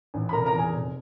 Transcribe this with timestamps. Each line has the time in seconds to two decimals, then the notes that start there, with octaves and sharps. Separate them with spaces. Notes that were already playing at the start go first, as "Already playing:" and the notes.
0.14 A1
0.29 B5
0.32 F1 A#4 A#5
0.45 A#4 A#5
0.52 E2
0.58 G#4 G#5
0.72 F1